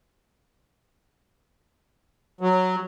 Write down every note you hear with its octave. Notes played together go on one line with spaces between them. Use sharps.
F#3